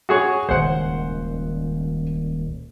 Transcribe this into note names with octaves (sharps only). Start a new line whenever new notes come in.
F#4 G#4 C#5
D#1 C#2 D#3 C5 F#5